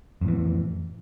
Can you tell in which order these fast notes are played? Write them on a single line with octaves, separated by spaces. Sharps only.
F2 A2 E3